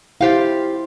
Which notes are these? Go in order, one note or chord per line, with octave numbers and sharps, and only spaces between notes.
E4 F4 G4 C5 F5